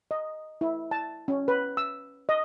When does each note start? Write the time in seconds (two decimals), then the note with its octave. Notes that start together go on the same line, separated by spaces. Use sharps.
0.11 D#5
0.61 E4
0.91 A5
1.28 C#4
1.48 B4
1.77 E6
2.29 D#5